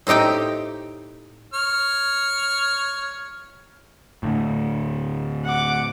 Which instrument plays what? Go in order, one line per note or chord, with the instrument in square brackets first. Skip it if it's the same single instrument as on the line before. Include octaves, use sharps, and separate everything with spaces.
[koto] A2 C4 D#4 G4 G5
[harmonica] C#5 F6
[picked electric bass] D2 A2
[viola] F#5 D6